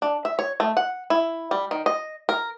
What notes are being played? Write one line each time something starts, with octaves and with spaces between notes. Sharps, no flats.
D4
E5
C#5
A3
F#5
E4
G3
D#3
D#5
A#4